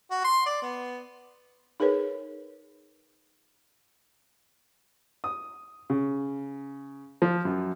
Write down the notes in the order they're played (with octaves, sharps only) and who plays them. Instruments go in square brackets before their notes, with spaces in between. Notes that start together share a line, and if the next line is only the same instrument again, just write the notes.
[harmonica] F#4
C6
D5
B3
[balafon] D#4 G#4 A#4 B4 C#5
[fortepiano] D#6
C#3
F3
F#2